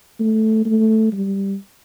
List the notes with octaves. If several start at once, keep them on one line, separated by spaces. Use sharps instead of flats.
A3
A3
G3